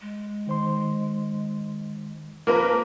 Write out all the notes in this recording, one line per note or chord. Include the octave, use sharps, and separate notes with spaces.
G#3
D#3 C5 C6
F3 A#3 A#4 B4